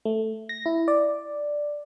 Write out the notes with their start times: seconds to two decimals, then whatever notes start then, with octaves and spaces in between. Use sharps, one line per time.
0.05 A3
0.49 A#6
0.66 E4
0.88 D5